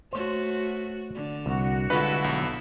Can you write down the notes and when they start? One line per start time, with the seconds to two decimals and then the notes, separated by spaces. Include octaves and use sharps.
0.13 A3 F#4 C5 C#5
1.15 D3
1.46 C2 F#4
1.90 D3 G#3 E4 F4 A4 B4
2.24 B1